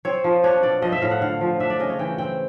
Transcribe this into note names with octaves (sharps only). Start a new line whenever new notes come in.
C4 C#5
F3
D4 C#5
B2 D5
F3 D#5
E5
A2 F5
F#5
D3 F5
F3
D4 E5
D5
C#3 D#5
C#5
E3 G5
C4 G5